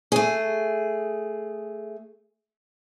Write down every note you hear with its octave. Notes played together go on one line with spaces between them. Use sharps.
A3 G#4